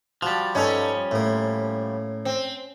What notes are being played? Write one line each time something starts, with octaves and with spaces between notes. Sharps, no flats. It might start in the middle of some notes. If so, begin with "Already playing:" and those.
F3 G3 F#4 A5
G2 C#4 D#4 A4
A2 A#3
C4